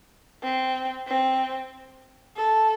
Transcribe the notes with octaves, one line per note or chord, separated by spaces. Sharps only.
C4
C4
A4